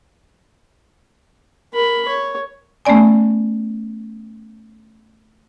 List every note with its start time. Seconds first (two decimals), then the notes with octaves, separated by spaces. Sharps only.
1.74 A#4 B5
2.08 C#5
2.85 A3 B3 C#4 D5 G#5